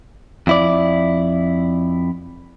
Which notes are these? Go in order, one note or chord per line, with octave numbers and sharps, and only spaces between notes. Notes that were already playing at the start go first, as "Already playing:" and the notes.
F2 E4 D5